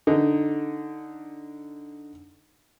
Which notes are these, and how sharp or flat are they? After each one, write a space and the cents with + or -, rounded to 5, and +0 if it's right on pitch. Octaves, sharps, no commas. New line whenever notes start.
D3 +0 D#4 +0